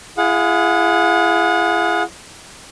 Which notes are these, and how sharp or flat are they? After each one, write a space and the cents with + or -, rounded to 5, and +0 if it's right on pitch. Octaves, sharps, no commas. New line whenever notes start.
E4 +40 G#4 +0 F#5 -35